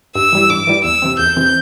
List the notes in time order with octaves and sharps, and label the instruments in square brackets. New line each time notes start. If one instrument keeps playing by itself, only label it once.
[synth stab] G2 [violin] E6
[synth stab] E3 G3 E4
[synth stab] G2 [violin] D6
[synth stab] E3 G3 E4
[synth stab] E2 [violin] E6
[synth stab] C3 E3 C4
[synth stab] E2 [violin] G6
[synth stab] C3 E3 C4